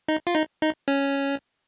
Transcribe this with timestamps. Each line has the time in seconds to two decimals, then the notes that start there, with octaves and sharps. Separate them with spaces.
0.08 D#4
0.27 F4
0.35 D#4
0.62 D#4
0.88 C#4